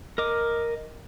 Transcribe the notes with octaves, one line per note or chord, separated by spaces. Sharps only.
A#4 D#5 D6